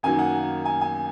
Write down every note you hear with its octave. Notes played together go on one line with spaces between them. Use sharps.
F#2 D#3 F#3 A#3 G#5
F#5
G#5
G#5